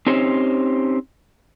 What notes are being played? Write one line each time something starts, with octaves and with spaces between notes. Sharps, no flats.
C4 C#4 D#4 G4 C5 C#5